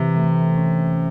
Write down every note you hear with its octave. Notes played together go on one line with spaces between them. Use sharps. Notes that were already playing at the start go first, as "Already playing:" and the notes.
Already playing: C3 E3
A3
C#4